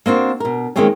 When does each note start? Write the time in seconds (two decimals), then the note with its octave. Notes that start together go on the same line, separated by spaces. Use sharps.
0.06 A#3 C4 D4 F#4
0.40 B2 A#4
0.76 D#3 F3 G#3 A#3 C4 C#4